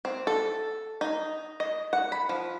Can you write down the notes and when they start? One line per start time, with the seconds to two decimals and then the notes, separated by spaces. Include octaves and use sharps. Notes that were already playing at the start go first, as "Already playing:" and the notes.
0.05 C4
0.27 A4
1.01 D#4
1.60 D#5
1.93 F#5
2.12 B5
2.29 F3